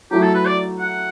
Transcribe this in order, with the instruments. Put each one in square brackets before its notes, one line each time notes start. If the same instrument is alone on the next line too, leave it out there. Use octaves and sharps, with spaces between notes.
[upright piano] F#3 A3 E4 [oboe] G4
[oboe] A4
B4
D5
F#5